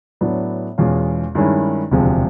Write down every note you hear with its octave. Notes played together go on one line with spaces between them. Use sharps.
A2 F#3 B3 D4
E2 B2 G#3 C#4 F4
G2 D#3 G#3 C#4 E4
E1 D2 C3 F3 G#3